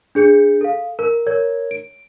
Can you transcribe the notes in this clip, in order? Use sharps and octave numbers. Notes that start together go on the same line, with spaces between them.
D4 G#4 G6 C#7
A4 F5
A#4
A#4 C#5 G#6
D7